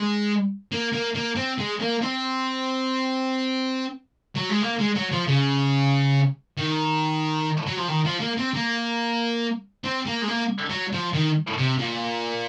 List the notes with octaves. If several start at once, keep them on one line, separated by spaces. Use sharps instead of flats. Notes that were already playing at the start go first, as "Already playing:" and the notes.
Already playing: G#3
A#3
A#3
A#3
C4
G#3
A#3
C4
F#3
G#3
A#3
G#3
F#3
F3
C#3
D#3
F#3
F3
D#3
F3
A#3
C4
A#3
C4
A#3
G#3
A#3
F#3
F3
D#3
C3
A#2